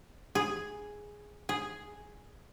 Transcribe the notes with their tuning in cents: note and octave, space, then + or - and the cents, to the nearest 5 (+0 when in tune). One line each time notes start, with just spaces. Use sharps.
G#4 +0
G#4 +0